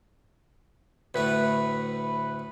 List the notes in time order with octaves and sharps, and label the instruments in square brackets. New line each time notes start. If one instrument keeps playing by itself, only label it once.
[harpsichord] D2 A2 A3 [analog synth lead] B4